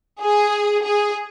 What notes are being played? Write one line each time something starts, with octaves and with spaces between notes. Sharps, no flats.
G#4
G#4